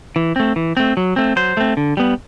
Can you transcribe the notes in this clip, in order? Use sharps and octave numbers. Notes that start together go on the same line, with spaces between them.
E3
A3 C4
E3
A3 C4
F#3
A3 C4
F#3 C5
A3 C4
D3
G3 B3